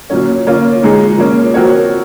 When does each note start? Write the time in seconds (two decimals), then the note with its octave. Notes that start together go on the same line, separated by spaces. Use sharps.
0.10 A#2 F#3 C#4
0.47 A#3 C#4 F4
0.83 A#2 G#3 D#4 G#4
1.18 F3 A#3 C#4
1.54 F3 C4 F#4 A#4 C#5